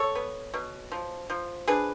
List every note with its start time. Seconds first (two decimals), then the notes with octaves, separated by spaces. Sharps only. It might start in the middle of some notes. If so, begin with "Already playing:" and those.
Already playing: A4 C#5
0.15 B3
0.54 B2
0.92 F3
1.30 F3
1.68 D4 G#4 B4